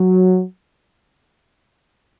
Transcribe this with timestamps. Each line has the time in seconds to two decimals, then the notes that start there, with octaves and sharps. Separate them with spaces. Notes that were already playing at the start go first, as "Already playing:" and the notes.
Already playing: F#3